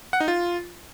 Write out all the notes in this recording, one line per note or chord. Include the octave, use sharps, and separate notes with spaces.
F#5
D#4
F4